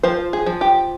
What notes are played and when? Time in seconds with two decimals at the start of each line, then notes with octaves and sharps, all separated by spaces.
0.03 F3 C5
0.33 G#4
0.46 F3
0.61 G4